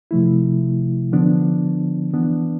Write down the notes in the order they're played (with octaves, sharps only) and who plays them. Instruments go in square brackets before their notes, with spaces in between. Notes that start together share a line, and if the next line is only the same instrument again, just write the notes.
[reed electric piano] C3 F3 A3 E4
D3 F3 B3 D4
E3 B3 D4